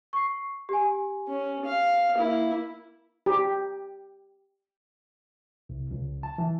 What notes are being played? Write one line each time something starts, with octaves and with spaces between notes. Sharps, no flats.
C#6 C7
G4 G#5
C#4
F5
A#3 E4
G4
C2
C#2
A5
E3